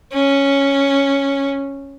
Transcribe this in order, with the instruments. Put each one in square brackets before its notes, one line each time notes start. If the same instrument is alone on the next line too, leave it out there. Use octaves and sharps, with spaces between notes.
[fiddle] C#4